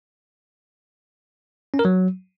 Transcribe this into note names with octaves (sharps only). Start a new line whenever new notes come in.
C#4
A#4
F#3